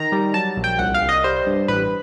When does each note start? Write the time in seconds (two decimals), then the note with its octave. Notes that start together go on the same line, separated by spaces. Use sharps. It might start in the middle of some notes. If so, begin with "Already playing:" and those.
Already playing: D#3 A#5
0.12 G3
0.34 F#3 A5
0.57 A#1
0.64 G5
0.79 C2 F#5
0.94 F5
1.02 C2
1.09 D#5
1.24 G3 C5
1.46 G2
1.68 A1 B4